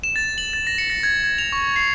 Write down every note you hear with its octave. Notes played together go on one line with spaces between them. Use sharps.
E7
A6
F#7
A6
A#6
C#7
A#6
G#6
G#6
F7
C#6
C7